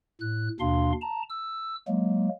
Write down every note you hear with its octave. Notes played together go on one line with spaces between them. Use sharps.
A2 F#6
D#2 B2 D4 F5 C6
A5 A#5
E6
F#3 G#3 A#3